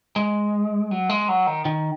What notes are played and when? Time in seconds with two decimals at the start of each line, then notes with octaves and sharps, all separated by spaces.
0.16 G#3
0.91 F#3
1.09 G#3
1.28 F#3
1.47 D#3
1.65 D#3